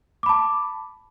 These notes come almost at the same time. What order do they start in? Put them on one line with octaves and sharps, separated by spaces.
D6 B5 A5